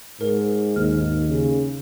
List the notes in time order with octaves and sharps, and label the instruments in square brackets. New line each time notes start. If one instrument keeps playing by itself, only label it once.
[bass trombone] G#2 [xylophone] A#4
[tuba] D#2 [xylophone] F6
[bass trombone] C#3